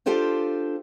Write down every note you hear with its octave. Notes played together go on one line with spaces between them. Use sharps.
D4 F4 G4 A4 C5 F5